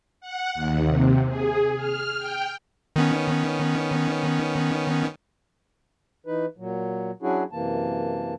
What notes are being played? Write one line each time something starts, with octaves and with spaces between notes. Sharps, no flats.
F#5
D#2
C3
G#4
F6
G5
D#3 B3 C#4
E3 D#4 B4
A#2 F#3
F#3 C#4 D4 E4 F#4 G#4
F#2 C3 E3 A#3 A5